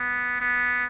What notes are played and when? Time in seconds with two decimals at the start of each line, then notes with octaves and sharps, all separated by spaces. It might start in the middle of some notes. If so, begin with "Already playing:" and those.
Already playing: B3
0.40 B3